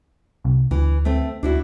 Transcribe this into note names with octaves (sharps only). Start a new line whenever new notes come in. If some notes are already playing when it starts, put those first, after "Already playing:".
C2
D2 E3
A3 C4
D2 D4 E4 F#4